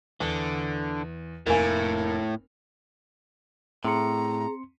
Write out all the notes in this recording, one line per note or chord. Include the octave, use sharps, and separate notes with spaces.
E2 D3
F1 A2 A#3 A#4 G#5
A2 C4 G#4 A#5 C6 C#7